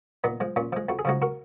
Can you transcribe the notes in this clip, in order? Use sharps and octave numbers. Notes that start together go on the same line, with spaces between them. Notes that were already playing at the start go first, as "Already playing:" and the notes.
A#2 B3 D#4
F3 G#3
A#2 C#4 F4
F3 G#3
F2 F#4
G#4
C#3 F3 G#3 D#4 F#4
F#4 A#4